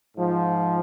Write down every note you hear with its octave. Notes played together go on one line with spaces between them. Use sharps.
G#2 F3